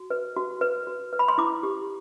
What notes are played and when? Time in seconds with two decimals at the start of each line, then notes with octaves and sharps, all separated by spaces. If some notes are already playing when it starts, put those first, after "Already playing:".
Already playing: F#4
0.10 B4
0.36 F#4
0.61 B4
0.87 F#4
1.13 B4
1.19 B5
1.28 C6
1.38 E4 D6
1.63 G4